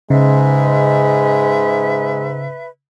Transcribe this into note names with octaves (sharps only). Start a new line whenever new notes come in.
G#2 C#3 G#3 B4 E5